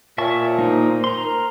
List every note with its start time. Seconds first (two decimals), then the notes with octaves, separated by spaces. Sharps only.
0.18 A#2 C#5 E5 A5 C#6
0.59 A#3 D#4 C5
1.04 A#5 C6
1.24 A#4